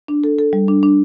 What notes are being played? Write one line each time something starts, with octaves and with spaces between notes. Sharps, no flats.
D4
A4
A4
G3
D4
D4